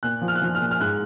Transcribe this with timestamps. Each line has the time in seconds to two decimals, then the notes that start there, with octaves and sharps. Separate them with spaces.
0.03 A#2 F#6
0.21 F3
0.28 F6
0.36 F#6
0.42 F3 F6
0.55 F6
0.61 A#2
0.71 F6
0.81 G#2 F#6